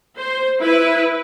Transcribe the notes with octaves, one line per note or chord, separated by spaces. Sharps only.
C5
E4 B4